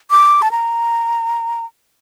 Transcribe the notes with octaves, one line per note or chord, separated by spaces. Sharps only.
D6
A5
A#5